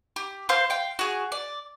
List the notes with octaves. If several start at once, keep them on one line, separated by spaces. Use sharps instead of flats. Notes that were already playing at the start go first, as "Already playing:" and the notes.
G4
C5 F5 C6 F6
F5 G5
F#4 G#4
D5